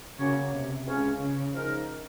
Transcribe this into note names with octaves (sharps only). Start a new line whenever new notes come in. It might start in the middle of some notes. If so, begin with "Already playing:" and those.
C#3 F#3 A#3 C#4 F#4 C#5
C3
C#2 C#3 G#3 C#4 F4
C#3
F3 G#3 D#4 A#4